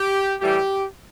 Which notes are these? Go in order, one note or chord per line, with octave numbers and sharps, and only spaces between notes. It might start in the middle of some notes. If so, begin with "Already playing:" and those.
Already playing: G4
A2 E3 G3 G4